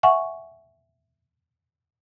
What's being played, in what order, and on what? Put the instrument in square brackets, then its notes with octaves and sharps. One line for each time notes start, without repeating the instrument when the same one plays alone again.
[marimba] E5 F#5 G#5 C#6